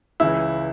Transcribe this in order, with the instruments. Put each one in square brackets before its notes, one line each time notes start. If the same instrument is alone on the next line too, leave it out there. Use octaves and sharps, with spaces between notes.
[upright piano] C#2 C#3 E3 E4